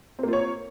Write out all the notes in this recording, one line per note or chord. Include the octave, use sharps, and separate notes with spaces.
A#3 C4 F4 C#5